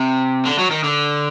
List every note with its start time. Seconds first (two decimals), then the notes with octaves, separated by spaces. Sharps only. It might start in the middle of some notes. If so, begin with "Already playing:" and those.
Already playing: C3
0.46 D3
0.59 F#3
0.71 D#3
0.84 D3